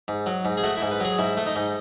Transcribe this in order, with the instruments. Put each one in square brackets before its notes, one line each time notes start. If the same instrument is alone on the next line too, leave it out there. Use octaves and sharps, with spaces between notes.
[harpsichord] G#2
F#3
G#2
G#4
A3 F#4
E4
G#2
B4
F#3 G#4
G#2 E4
A3
D#4
G#2